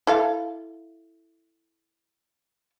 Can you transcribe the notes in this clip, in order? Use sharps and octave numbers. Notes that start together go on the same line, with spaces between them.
E4 A4 F5